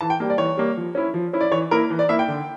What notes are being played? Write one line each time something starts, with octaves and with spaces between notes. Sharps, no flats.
E3 A5
G5
G3 A#3
D5
E3 C#5
G3 A#3
F3
C#4 E4
F3
C#4 E4
D5
E3 C#5
A#3 E4 A#4
E3
D5
A#3 E4 E5
G5
D3